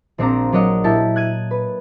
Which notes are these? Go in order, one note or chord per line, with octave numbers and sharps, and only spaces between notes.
A#1 C4 D4 F5 A#5
F#3 D4 A#4 C#5 D#5 F#5
A#2 E4 G4 A5 C#7
F#6 G#6 D#7
B4